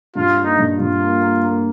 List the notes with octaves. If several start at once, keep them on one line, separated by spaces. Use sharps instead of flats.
G2 F4
A#3
D#4
G2
F4
G2
A#3
A#3
A#3